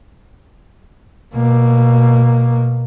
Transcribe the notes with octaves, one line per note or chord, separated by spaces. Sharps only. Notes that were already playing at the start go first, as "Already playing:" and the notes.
B2 A#3